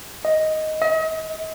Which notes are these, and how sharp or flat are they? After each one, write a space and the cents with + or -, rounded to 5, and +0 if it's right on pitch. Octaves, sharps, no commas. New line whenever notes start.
D#5 +5
D#5 +40